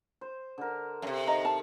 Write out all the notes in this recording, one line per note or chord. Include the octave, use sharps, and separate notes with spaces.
C5
D3 A#4
F#2 C3
D#3 D#5 A#5
A5